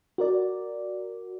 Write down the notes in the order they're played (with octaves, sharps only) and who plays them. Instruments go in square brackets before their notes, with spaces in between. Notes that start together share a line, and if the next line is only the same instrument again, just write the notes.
[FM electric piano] F#4 A#4 D5